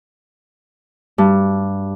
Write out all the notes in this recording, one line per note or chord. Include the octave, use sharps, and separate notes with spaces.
G2